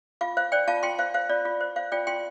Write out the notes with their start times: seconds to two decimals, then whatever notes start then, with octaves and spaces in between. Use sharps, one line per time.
0.21 F4 F5
0.37 C5 F5
0.52 C5 D5 G5
0.68 F4 F5 A5
0.83 F4 G5 C6
0.99 C5 F5
1.14 C5 F5
1.29 F4 D5
1.45 F4
1.61 C5
1.76 C5 F5
1.92 F4 D5 G5
2.07 F4 G5 C6